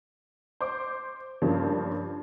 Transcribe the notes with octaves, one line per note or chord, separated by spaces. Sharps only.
C5 D6
G2 F3 A#3 C#4 G4